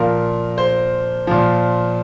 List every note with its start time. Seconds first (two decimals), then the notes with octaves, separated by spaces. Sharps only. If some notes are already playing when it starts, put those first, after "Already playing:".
Already playing: A#2 F3 A#4
0.58 C5
1.27 A#2 F3